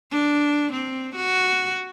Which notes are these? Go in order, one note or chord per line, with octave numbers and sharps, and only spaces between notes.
D4
C4
F#4